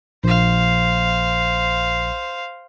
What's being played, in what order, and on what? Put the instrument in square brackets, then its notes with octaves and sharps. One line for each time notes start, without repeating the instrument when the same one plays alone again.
[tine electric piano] A#1 [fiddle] C5 F5